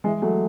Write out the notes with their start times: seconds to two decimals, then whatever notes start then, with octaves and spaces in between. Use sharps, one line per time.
0.04 E3 G#3
0.22 F#3 A3